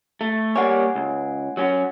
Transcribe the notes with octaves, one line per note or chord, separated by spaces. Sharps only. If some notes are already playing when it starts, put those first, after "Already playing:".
A3
G3 A#3 C#5 F#5 G#5
C#2
F#3 C#4 F#4